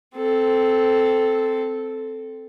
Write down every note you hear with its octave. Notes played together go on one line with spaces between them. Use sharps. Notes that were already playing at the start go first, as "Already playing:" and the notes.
C4 A4